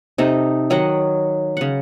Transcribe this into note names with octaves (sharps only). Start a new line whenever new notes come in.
C3 D#4 A4
D#3 F#3 D#5 F#5
C#3 F#5